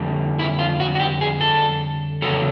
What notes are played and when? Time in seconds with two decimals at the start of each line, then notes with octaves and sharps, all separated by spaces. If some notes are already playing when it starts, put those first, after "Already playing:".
Already playing: F2 D3 G3
0.39 E4
0.59 F4
0.80 F#4
0.95 F#4
1.00 G4
1.21 G#4
1.41 A4
2.22 E2 C#3 F#3 A4